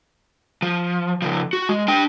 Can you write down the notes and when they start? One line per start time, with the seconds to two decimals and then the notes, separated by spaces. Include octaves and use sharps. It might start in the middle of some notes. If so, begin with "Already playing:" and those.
0.62 F3
1.22 C#3 F3
1.53 F#4
1.69 G#3
1.88 D4 G5